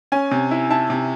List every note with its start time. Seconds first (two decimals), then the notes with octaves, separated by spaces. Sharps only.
0.12 C#4 G#5
0.31 C3
0.51 E4
0.70 E4 A5
0.90 C3